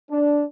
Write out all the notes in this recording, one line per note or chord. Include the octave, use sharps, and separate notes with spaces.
D4